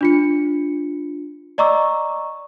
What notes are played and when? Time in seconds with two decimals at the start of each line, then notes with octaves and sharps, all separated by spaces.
0.01 D4 F4 C#7
1.58 D5 D#5 A#5 C#6 D6 E6